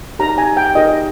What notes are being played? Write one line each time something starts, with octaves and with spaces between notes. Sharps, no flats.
D#4 G4 A#4 C#5 A#5
G#5
G5
D#4 G4 A#4 C#5 D#5